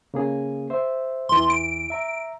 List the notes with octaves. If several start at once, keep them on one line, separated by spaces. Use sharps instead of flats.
C#3 A#3 G#4
C5 E5
E2 E3 C6
D7
E5 A#5